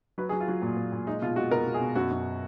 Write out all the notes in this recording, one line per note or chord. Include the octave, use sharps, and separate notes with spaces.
F#3 B4
G#4
F#3
F4
F#3
A#2
A#2
A#2
G#3 D#4
B2 F4
G#3 F#4
B2 A#4
B2
G#4
B2
F#2 F#4
F#2